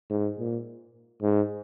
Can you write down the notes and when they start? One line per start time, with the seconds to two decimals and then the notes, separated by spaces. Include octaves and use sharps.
0.10 G#2
0.39 A#2
1.22 G#2